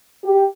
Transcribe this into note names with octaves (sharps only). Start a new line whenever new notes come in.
G4